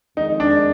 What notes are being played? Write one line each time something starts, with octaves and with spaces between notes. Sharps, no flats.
F2 D#3 G#3 D#4
D4